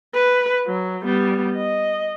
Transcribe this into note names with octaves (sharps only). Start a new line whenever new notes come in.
B4
F#3
G3 B3
D#5